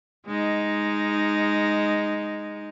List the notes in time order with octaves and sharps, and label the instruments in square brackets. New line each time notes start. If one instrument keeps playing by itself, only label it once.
[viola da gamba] G#3 D#4